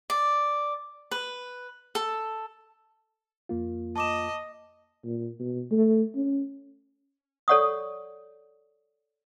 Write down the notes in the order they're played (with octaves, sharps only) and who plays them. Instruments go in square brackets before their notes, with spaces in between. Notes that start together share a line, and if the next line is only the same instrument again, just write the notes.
[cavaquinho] D5
B4
A4
[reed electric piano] F2 A#3 F4
[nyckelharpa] D#5 [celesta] A5 D6 E7
[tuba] A#2
B2
A3
C#4
[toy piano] A4 C#5 D5 F#5 C#6 D#6